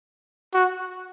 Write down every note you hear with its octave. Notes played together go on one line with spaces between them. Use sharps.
F#4